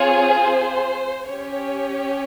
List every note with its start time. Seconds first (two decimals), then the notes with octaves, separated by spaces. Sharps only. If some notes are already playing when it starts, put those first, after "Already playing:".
Already playing: C4 F4 G#4 C#5
0.35 C5
1.27 C#4 G4 C#5